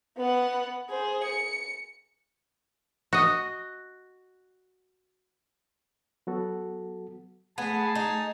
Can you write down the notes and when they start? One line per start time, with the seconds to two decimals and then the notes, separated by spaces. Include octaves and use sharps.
0.17 B3 F#5
0.89 G#4 C5
1.23 C#7
3.13 F#4 D#5
6.27 F#3 B3 F#4 A4
7.58 A3 B3 G#4 G#5 A5
7.95 D#4